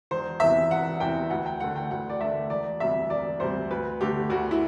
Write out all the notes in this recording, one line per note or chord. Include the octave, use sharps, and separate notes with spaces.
E1 C5
E2 C3 E3 E5
E1 F#5
E2 C3 E3 G5
D2 F#5
G5
D3 A3 F#5
G5
D2 F#5
D5
D3 A3 E5
E1 D5
D2 C3 G3 E5
E1 D5
D2 C3 G3 C5
D2 B4
D3 A3 G4
D2 F#4
E4